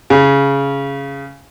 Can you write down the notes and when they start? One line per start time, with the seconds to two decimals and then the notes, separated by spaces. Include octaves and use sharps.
0.10 C#3